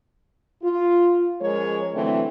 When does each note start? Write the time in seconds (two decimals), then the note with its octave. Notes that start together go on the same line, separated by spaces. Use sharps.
0.63 F4
1.41 F3 G#3 C#4 A#4 C#5
1.94 D3 E3 F#3 A3 C4 D4